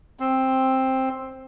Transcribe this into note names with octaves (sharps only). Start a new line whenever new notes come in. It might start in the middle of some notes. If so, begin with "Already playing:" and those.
C4